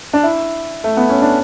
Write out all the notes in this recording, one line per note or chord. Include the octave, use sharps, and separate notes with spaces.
D4
E4
A3
B3
C#4
D4